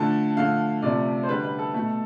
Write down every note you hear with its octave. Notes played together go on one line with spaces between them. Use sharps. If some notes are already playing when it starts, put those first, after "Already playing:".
Already playing: D3 F3 A3 A5
D3 F3 A3 F5
C3 F3 A3 D5
C5
D3 G3 B4
B4
A4
B2 A3